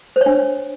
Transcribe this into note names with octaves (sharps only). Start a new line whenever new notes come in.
C5
C#5
D4